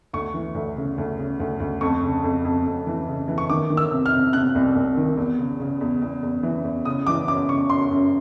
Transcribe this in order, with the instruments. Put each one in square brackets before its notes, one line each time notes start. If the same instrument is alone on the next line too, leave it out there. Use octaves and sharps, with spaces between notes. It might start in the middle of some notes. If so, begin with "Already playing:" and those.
[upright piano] D2 C#6
E3
D2
C#3
D2
C#3
D2
D2
F2 C#6
C#3
F2
F2
F2
E3
C#3
E3
C#6
D#3 D6
D#3
E6
C3
F6
C3
C3 F#6
C2
C2
D#3
E2
C#3
C#3
E2
E2
E2
E3
E2
C#3 D#6
E3 D6
F#2 D6
C#3 C#6
F#2 C6
F#2